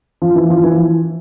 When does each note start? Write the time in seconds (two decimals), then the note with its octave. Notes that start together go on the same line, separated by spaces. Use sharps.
0.22 F3
0.36 E3
0.50 F3
0.64 E3